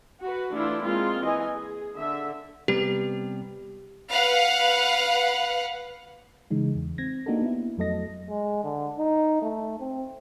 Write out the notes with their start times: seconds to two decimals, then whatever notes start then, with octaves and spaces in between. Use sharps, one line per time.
0.20 F#4 B4
0.51 E3 A3 D4 E4 F4
0.83 G#3 A#3 C4 F4
1.23 E3 D#5 G#5
1.56 G#4
1.96 D3 E5
2.68 C3 G3 B3 G4
4.12 B4 F5 F#5
6.51 C#3 E3 G#3 D#4
6.75 E2
6.98 C4 G#6 A#6
7.26 A#3 D4 D#4 F#4 G4 A4
7.42 B3 E4
7.78 F2 F#3 A3 A4 D#5 A#6
8.29 G#3
8.64 D3
8.98 D#4
9.42 A3
9.80 C4